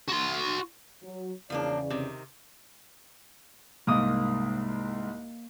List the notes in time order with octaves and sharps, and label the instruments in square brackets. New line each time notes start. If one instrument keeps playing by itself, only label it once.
[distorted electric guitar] F#4 C6
[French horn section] F#3
[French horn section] E2 C#3 D5 [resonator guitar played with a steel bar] F3 A#3 D4
[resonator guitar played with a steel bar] C3 D#3
[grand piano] C2 G#2 [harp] A#3 D#6